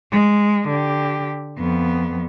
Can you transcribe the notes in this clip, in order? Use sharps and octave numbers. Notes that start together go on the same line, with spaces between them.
G#3
D3 G4
F2 B3